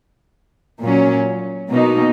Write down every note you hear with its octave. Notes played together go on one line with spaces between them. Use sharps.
A#2 F#3 C#4
B2 A#3 D#4